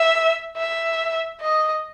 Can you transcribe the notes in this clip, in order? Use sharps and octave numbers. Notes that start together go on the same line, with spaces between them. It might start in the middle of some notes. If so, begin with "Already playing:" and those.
Already playing: E5
E5
D#5